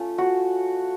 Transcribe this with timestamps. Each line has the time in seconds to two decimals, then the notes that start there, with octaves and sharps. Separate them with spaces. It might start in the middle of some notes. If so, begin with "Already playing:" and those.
Already playing: A3 C#4 F4
0.18 F#4